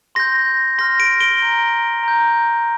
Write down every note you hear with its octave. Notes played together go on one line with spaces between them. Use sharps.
C6 G6 A#6
C6 F6 A#6
A#6 D7
D7 G7
A#5 G6
A#5 G6